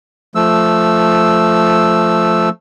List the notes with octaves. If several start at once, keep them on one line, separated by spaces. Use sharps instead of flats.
F3 A3 E6